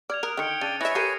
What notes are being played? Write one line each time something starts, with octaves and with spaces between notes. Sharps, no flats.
D5 F6 G#6 F7
A#4 D#6 F#6 D7
D3 D#3 G5 F6 C#7
C#3 D4 A6 D#7
E4 B4 C#5 E5 G#5 A#6
G4 A4 A#4 C7 D#7